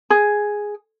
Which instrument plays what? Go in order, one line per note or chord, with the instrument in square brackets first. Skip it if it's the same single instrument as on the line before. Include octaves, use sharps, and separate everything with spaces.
[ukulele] G#4